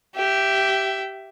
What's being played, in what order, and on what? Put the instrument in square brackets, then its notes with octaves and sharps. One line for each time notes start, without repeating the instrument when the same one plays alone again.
[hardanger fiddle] G4 E5